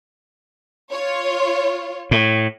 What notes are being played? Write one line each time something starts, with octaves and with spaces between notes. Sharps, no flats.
F4 C#5
A2